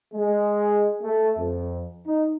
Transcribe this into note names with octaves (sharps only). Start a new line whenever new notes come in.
G#3
A3
F2
D#4